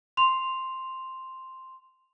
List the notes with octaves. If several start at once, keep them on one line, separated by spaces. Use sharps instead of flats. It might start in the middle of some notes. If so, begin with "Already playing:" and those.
C6 F7